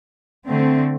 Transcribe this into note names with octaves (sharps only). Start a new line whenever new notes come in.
D3 A3 C4